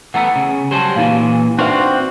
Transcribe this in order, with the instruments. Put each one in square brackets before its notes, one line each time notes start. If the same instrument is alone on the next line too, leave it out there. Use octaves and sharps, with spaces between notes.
[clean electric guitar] E3 A3 B3 [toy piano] F#5 A#5 E6
[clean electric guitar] C#3
[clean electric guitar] F#3 G3 C5 [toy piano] G4 G#5 A5
[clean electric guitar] A#2 E3 [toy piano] D#4 F5
[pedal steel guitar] C4 F#4 [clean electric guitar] D4 F5 [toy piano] D#4 B4 E5
[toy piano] C6